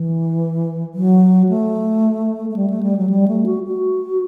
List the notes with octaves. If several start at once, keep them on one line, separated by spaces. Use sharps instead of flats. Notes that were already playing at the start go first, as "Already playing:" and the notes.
Already playing: E3
F#3
A3
A3
G3
A3
G3
F#3
G3
A3
F#4
F#4